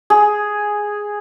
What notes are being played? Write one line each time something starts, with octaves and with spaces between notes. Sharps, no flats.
G#4